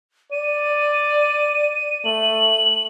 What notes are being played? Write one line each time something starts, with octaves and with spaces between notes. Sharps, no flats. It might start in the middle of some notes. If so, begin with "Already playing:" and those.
D5 D#7
A3 F#7